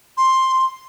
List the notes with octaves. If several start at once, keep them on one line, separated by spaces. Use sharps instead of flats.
C6